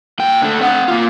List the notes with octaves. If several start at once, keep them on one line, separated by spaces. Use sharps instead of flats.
A#2 G5
D3 A3
C4 F#5
A#3 F4